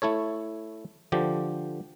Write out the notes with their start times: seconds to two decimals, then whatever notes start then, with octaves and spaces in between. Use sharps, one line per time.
0.02 A3 E4 A4 C#5
1.12 D3 F3 G4